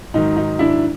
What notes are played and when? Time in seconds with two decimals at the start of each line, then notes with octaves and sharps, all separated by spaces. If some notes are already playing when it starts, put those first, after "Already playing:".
0.14 G#2 D#3 F#3 D#4
0.37 D#4
0.59 D4 E4